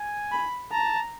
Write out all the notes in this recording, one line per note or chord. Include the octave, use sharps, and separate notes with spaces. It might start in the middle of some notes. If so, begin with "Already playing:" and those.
Already playing: G#5
B5
A5 A#5